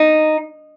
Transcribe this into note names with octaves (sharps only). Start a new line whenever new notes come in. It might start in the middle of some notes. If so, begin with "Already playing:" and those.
Already playing: D#4